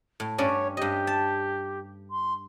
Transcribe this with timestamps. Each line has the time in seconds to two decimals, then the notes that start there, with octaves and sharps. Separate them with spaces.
0.20 A2
0.38 G2 C#4 C#5 D5
0.77 G2 G4 D#5
1.07 A5
2.10 C6